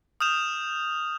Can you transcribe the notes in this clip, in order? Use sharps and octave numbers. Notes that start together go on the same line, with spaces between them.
D#6 F6 G6 E7 F7